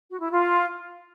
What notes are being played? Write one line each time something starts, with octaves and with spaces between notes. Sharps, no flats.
F#4
E4
F4